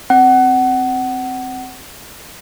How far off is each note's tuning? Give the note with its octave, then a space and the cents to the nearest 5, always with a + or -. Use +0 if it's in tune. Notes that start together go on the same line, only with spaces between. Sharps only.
C4 +0 F#5 +20